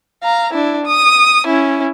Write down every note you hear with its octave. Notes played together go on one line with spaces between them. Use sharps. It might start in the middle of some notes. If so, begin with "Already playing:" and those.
F5 A#5
D4 E4
D#6
C#4 E4